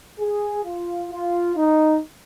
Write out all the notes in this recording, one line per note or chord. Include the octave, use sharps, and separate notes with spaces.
G#4
F4
F4
D#4